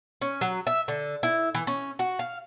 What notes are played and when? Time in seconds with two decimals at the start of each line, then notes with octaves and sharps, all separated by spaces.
0.21 C#4
0.41 F#3
0.67 E5
0.88 D3
1.23 E4
1.55 E3
1.67 C#4
1.99 F#4
2.19 F5